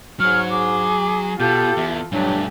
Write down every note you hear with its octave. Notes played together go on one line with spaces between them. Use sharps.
G#2 F#3 G#4 C#5 F6
G#4 D6
B2 F4 G4 A4 G6
E2 E5
G2 F#3 A3 D4 G4 G#5